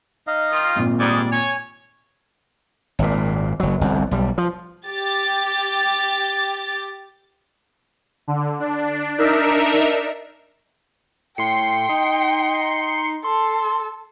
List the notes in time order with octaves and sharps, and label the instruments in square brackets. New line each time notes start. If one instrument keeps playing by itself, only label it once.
[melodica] D#4 D#5 F5
[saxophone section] D#3 F4
[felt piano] G#1 A#2
[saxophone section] G#2 [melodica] G3 D5 D6
[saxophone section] C#5 [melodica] G#5
[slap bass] G#1 A#2
F#1 F#3
G1 C2 F2
B1 G3
F3
[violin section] G4 A6
[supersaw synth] D3
D4
D4 D#4 A#4 E5
[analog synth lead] A2 [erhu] G5 [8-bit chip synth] C6 C7 C#7
[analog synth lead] D#4
[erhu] A4 [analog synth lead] C6